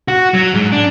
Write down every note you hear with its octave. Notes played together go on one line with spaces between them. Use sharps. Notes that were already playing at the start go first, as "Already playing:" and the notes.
F#4
F#3
G#2
D4